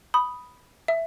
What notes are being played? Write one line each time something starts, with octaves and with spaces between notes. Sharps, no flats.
B5 D#6
E5